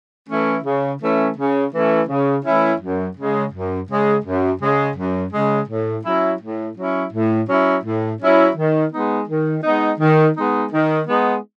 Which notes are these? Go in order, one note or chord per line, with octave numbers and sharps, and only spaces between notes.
E3 A3 C#4 E4
C#3
E3 A3 C#4 E4
C#3
E3 A3 C#4 E4
C#3
E3 A3 C#4 E4
F#2
C#3 G#3
F#2
C#3 G#3
F#2
C#3 G#3
F#2
C#3 G#3
A2
F#3 C#4 E4
A2
F#3 C#4 E4
A2
F#3 C#4 E4
A2
F#3 C#4 E4
D#3
G#3 B3 D#4
D#3
G#3 B3 D#4
D#3
G#3 B3 D#4
D#3
G#3 B3 D#4